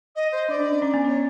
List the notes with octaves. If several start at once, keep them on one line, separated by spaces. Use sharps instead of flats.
D#5
C5
D4 D5
D4
C#4
C#4
B3
C#4
C#5